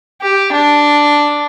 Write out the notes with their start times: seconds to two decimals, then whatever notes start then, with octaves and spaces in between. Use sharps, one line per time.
0.22 G4
0.52 D4